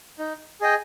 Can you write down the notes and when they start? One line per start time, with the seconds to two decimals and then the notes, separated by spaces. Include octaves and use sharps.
0.19 D#4
0.61 G#4 D#5 G5